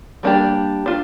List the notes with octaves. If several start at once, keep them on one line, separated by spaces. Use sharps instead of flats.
G3 A#3 D4 G4
D4 F4